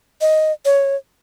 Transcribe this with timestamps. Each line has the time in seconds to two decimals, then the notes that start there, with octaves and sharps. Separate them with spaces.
0.21 D#5
0.65 C#5